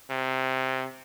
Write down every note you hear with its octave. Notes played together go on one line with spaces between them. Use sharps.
C3